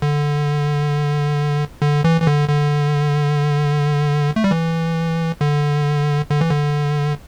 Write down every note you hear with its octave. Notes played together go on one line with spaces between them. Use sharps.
D3
D3
E3
E3
D3
D3
A3
G3
E3
D3
D3
E3
D3